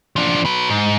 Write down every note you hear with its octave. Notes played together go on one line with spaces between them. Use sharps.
F3 D4
F#3 B4
G#2